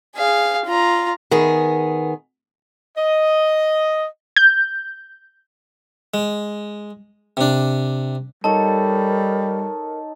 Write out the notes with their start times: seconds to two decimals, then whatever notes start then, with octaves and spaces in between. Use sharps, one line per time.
0.16 G#4 F5
0.66 F4 A#5
1.31 D#3 B3 G#4
2.96 D#5
4.37 G6
6.14 G#3
7.37 C3 D4
8.44 G3 D#4 A4 A#4 C#5 A5